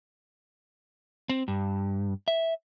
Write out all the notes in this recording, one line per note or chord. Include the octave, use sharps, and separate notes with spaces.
C4
G2
E5